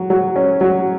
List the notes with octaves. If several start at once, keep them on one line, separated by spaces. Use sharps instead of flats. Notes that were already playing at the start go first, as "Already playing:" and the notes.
Already playing: F#3
F#3
C#4
F#3